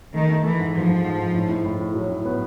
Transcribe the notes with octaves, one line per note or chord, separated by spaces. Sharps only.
D#3 A3
A3
E3 A3
G#2
G#2 F3
G#2
G#2
G#2
A2
A2
A2
A2
F#3
A2
B3